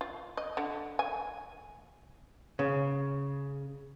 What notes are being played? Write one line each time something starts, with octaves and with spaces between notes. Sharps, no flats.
F4
D#5
D3
G#5
C#3